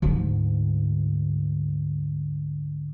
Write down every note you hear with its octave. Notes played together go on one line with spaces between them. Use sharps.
D2 G#2